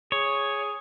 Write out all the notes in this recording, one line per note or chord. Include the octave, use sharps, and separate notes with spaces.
G#4 C#5